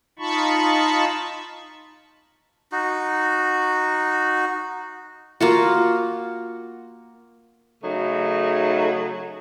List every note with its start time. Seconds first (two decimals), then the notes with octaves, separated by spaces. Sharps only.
0.19 D#4 F4 A5 B5 C#6
2.72 D#4 F#4
5.41 A#3 F4 F#4
7.84 C#3 F#3 A3 D#4